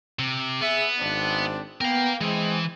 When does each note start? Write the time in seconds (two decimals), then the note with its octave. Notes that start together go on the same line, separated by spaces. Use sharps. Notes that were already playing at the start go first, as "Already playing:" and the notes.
0.19 C3
0.61 B3 G#4 E5
1.00 G#1 C4 D4
1.81 B3 A#4 F5 G5
2.21 E3 G#3 C4 G#4